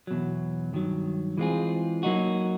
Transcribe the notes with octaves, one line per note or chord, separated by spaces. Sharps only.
E2 B2 F#3
G2 D#3 F#3
E3 G#3 C4 F4 G#4
F#3 A#3 D#4 F#4